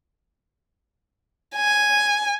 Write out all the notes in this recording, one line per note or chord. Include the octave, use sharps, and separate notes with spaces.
G#5